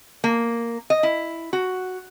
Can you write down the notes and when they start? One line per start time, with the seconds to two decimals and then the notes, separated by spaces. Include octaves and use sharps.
0.24 A#3
0.90 D#5
1.03 E4
1.53 F#4